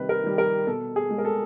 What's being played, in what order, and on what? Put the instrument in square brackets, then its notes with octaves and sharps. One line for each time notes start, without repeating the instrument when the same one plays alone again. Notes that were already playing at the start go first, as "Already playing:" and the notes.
Already playing: [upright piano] C3 D#3 G3 B4
A#4
D#3 G3
A#4
B2 A4
G#4
G#3
A#4
A4